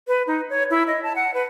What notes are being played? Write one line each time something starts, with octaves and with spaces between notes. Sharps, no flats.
B4
D#4
C#5
E4
D#5
A5
F#5
B4